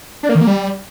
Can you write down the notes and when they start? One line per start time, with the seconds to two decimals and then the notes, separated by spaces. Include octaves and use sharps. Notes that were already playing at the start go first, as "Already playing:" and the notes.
0.23 D4
0.29 A#3
0.35 D#3
0.41 A#3
0.47 G3